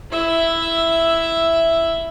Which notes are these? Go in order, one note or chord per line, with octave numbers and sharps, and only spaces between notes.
E4 E5